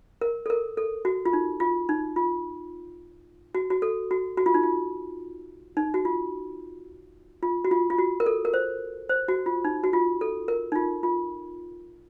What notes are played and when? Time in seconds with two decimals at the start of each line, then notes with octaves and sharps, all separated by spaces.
0.21 A#4
0.46 A4
0.50 A#4
0.77 A4
1.05 F#4
1.25 F4
1.33 D#4
1.60 F4
1.89 D#4
2.16 F4
3.55 F#4
3.70 F#4
3.82 A4
4.11 F#4
4.37 F#4
4.46 F4
4.54 D#4
4.63 F4
5.77 D#4
5.94 F#4
6.05 F4
7.43 F4
7.65 F#4
7.71 F4
7.90 F4
7.98 F#4
8.20 A#4
8.26 A4
8.45 A#4
8.54 C5
9.09 C5
9.28 F#4
9.46 F4
9.65 D#4
9.84 F#4
9.93 F4
10.21 A4
10.48 A#4
10.72 D#4
10.76 F4
11.03 F4